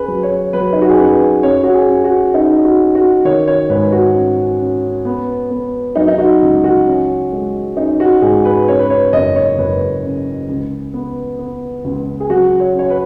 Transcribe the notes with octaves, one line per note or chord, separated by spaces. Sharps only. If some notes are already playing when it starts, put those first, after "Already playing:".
Already playing: F#2 G#4 B4
F#3
C#5
F#3 B4
D#4
F#4
G#4
F#2 B4
F#2 C#5
F#4
G#4
F#2
F#4
C#4 D#4
F#4
F#2
F#4
D#3 C#5
C#5
G#2 B4
F#4
C#4
C#4
B3
B3
F#3 D#4
D#4
F#4
C#2
F#4
C#4
G#3
C#4 D#4
F#4
G#2 G#4
B4
C#3 C#5
B4
C#5
F#1 D#5
C#5
F#1 B4
C#3
C#2
B3
B3
C#2
G#4
F#3 F#4
C#5
C#4 C#5
B4